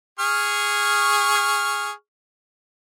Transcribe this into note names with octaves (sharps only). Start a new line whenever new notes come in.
G#4 C#6 F6